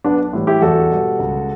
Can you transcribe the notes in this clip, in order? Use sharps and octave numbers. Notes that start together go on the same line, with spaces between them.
B1 B3 D4
A2 E3 G3
E4 G4
E2 F#4 A4
B2 G3
C#2